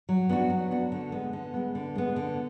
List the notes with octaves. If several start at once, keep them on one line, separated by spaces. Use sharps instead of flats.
F#3
B3 D4 F#4
F#3
B3 D4 F#4
D3
G#3 B3
D3
G#3 B3
D3
G#3 B3
D3